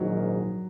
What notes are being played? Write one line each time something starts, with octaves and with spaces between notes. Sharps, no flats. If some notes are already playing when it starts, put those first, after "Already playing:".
Already playing: A#1 G#2 D#3 F#3